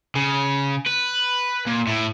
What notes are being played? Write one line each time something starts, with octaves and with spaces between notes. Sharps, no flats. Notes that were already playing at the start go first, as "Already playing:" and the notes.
C#3
B4
A#2
A2